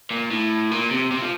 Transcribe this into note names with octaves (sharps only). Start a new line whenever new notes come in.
A#2
A2
A#2
C3
C3
F3